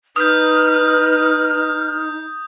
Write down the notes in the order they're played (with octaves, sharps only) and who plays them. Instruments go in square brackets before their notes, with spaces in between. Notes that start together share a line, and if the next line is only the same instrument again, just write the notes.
[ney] D#4 [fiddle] B4 [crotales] D#6 G6 [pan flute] F6